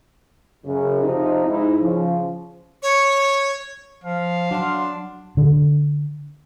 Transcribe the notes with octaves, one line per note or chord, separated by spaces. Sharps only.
F#2 C#3
C3 F3 D#4
G#2 D#4 E4
C#3 F3
C#5
F3 F5
F#3 D4 F#5 C6
D3